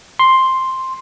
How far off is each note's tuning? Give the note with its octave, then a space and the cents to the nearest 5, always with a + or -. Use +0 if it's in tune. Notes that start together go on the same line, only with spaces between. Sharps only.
C6 +5